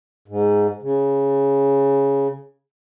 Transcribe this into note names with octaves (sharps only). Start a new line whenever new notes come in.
G#2
C#3